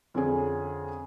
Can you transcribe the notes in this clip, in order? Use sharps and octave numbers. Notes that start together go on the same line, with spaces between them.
F2 D3 C#4 G#4